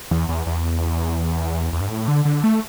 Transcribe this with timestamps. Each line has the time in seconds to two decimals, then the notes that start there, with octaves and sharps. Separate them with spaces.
0.11 E2
0.29 E2
0.46 E2
1.73 E2
1.81 G2
1.89 A2
2.08 D3
2.25 D3
2.44 A3